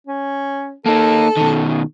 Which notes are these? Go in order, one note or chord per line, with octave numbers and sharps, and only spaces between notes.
C#4
A#3 D#4 A4
B2 D#3